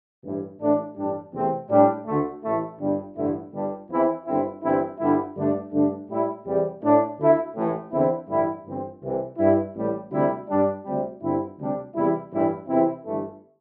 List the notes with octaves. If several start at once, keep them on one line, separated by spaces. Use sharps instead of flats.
A1 G2 E3 G3
A1 A2 A3 D4
A1 G2 G3 D4
E2 C3 A3 C4
A2 G3 D4
D2 D3 A3
A1 A2 A3 E4
G1 G2 G3
A1 G2 D3 A3 E4
G1 G2 G3 D4
E2 E3 C4 E4
G1 G2 D3 C4 E4
G1 G2 E3 C4 E4
G1 G2 D3 G3 E4
G2 D3 A3 D4
G2 D3 A3 D4
A2 G3 E4
E2 C3 G3
A2 A3 D4
D2 D3 A3 E4
A1 A2 E3
E2 D3 C4 E4
A1 G2 D3 G3 E4
G1 G2 E3 C4
C2 C3 E3
G2 G3 E4
A1 A2 G3
D2 C3 G3 E4
G2 G3 D4
D2 C3 G3
G1 G2 D3 C4 E4
D2 C3 G3 D4
E2 C3 G3 E4
A1 G2 E3 G3 E4
E2 C3 E3 C4 E4
G1 G2 E3 A3